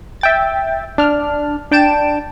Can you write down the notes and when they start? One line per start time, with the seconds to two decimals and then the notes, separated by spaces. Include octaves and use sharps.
0.21 E5 G5 A6
0.98 D4 F6
1.71 D4 G5 A5 D7 E7